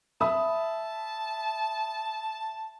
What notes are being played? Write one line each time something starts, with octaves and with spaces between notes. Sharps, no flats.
E5 A5 B5 D#6